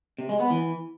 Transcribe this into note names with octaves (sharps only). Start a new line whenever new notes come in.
C3
G#3
B3
E3